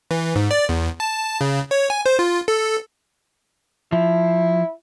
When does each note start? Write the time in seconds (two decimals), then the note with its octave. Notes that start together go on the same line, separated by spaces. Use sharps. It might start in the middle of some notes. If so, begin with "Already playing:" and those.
0.11 E3
0.36 G#2
0.51 D5
0.69 E2
1.00 A5
1.41 C#3
1.71 C#5
1.90 G#5
2.06 C5
2.19 F4
2.48 A4
3.92 F3 E4